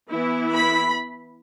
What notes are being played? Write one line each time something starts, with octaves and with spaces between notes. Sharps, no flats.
E3 B3 E4
B5